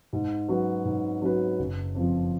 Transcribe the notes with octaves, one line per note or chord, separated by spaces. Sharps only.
G#2
F#3 C#4 F#4 B4
G#2
F#3 C#4 F#4 B4
F#1
F2 F3